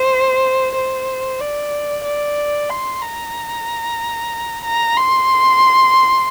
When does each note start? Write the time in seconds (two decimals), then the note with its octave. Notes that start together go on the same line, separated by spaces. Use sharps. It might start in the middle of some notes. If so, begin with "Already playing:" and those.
Already playing: C5
0.74 C5
1.40 D5
2.04 D5
2.69 C6
3.02 A#5
4.64 A#5
4.97 C6